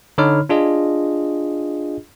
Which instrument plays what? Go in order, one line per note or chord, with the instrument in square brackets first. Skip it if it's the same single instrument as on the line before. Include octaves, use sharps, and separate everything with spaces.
[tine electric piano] D3 D#4 C#5 B5 F6
D4 F4 G#4 D#5